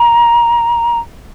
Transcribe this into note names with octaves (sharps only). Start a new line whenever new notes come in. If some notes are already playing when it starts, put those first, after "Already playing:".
Already playing: A#5